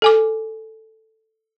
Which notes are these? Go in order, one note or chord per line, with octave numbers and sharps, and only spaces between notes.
A4 G#5 D6